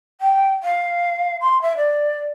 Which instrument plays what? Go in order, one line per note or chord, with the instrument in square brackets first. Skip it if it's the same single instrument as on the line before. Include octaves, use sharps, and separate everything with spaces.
[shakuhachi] G5
F5
C6
E5
D5